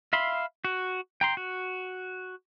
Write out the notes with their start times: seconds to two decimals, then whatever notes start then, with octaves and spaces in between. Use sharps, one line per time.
0.13 E5 F5 B5 C6
0.65 F#4
1.21 G5 A#5 C6
1.37 F#4